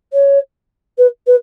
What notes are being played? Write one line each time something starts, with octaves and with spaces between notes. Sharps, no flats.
C#5
B4
B4